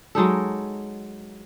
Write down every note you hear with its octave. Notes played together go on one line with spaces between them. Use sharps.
F#3 G#3 D#4 A4